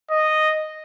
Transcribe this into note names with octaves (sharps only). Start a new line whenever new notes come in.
D#5